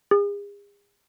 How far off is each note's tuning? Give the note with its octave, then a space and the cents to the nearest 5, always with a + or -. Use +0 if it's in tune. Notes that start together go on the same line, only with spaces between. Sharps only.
G#4 -40